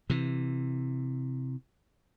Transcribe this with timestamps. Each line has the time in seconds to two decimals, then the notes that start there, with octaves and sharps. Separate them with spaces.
0.10 C3 E3